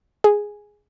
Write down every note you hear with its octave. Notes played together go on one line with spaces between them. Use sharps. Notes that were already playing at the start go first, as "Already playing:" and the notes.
G#4